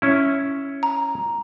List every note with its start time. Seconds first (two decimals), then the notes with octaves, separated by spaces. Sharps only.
0.02 C#4 E4
0.83 A#5